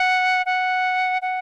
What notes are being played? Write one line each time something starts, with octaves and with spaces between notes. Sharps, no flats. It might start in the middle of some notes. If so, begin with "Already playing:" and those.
Already playing: F#5
F#5
F#5